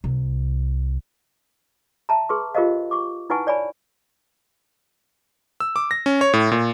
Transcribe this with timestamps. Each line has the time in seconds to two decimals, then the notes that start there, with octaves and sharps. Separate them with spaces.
0.04 C2
2.09 E5 A5 A#5
2.29 G#4 B4 C6 C#6
2.55 F4 G4 A#4 C5 D#5 F5
2.91 C#6 D6
3.30 D#4 E4 B4 F#5 G#5 C#6
3.47 C#5 D5 G#5 B5
5.60 E6
5.76 D6
5.91 A#6
6.06 C#4
6.21 C#5
6.33 A2
6.52 A#2